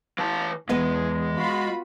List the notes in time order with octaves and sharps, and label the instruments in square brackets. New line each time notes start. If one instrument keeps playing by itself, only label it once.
[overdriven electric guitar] E3 A5
[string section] E2 [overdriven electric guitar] G#3 [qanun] B3 B4 D#5
[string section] F4 F#4 B5